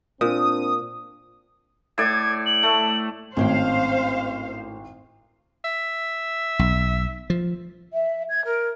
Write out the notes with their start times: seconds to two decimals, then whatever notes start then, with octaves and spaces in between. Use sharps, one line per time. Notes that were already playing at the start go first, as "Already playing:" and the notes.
0.21 A#2 C4 D4 D#6
1.98 A2 D5 G#6
2.46 F#7
2.63 A3
3.37 G#1 A2 C#4 C5 F5 G5
5.64 E5
6.59 B1
7.30 F3
7.93 E5
8.29 G#6
8.45 A#4